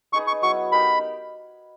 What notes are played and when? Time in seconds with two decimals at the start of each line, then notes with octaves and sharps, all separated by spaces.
0.13 D#4 G#4 B4 C#6
0.27 C#6
0.42 F#3 B3 E4 C#6
0.72 B3 D#4 G4 A#4 B5